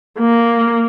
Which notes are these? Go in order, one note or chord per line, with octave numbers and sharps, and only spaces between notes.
A#3